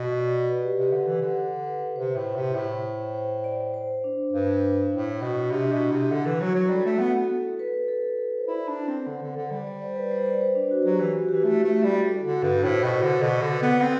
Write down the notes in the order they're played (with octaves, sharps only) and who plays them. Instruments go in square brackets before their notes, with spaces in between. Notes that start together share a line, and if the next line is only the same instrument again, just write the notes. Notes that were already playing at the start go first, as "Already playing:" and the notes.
Already playing: [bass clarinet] B2
[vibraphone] D5
D5
B4
G4
[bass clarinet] C3 [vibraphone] G4
[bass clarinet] D3
E3
D3
[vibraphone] B4
[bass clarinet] C3 [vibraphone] C5
[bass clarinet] A2
C3
A2
[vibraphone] C5
D5
C5
D4
[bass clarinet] G2
[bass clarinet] A2 [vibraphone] E4
[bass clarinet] B2
[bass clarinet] C3 [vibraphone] D4
[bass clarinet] B2
[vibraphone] E4
[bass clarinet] C3
[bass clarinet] D3 [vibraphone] E4
[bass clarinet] E3
[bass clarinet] F#3 [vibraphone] F#4
[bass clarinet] F#3
[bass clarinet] G3 [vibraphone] A4
[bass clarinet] A3
B3
[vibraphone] A4
B4
A4
C5
[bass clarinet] E4 [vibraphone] D5
[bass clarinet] D4
C4
D3
D3
D3
G3
[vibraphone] D5
C5
B4
C5
D5
C5
D4
F#4
[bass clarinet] F#3 [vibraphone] G4
[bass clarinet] E3
[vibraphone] F#4
[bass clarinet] E3 [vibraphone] G4
[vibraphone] F#4
[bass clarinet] A3 [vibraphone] E4
[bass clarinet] A3 [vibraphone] E4
[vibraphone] F#4
[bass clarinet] G3
[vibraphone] G4
A4
[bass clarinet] D3 [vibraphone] F#4
[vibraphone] F#4
[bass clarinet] G2 [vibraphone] B4
[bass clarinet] A2 [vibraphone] C5
[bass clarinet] B2
[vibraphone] C5
[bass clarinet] D3
[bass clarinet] B2 [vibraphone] D5
[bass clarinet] D3
[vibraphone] B4
[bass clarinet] B3
[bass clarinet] C4 [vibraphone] A4